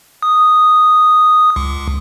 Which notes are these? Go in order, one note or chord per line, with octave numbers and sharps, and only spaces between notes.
D#6
C#2